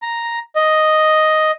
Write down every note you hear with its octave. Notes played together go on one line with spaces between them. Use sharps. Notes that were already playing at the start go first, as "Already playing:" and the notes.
A#5
D#5